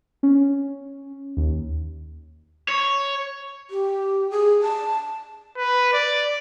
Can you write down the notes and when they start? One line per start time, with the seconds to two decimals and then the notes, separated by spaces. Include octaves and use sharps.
0.23 C#4
1.37 D#2
2.68 C#5
3.70 G4
4.30 G#4
4.62 A5
5.57 B4
5.93 D5